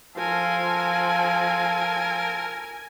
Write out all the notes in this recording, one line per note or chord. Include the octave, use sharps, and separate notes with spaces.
F3 A4 A#4 G#5